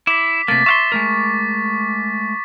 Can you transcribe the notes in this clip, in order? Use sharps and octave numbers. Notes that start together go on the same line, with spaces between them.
E4 D6 B6
C3 A3 A#3 A6 B6
E5 F5 C6 C#6 A6
G#3 A3 A#4